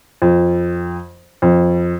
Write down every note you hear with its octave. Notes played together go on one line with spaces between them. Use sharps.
F2
F2